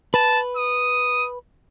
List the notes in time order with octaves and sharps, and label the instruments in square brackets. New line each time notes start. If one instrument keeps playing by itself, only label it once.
[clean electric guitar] B4 [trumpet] A5
[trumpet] D#6